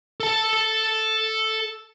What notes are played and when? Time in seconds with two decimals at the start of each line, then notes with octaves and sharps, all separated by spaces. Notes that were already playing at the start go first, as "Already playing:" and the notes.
0.20 A4 A5